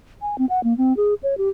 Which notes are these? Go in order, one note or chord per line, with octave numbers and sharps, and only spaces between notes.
G#5
C4
F#5
A#3
C4
G#4
C#5
G4